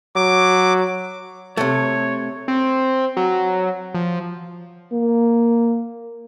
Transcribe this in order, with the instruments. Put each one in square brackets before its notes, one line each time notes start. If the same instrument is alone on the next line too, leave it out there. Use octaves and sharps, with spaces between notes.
[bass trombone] F#3 [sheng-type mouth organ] D6
[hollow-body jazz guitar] C3 A3 [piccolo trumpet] C#5
[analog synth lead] C4
F#3
F3
[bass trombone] A#3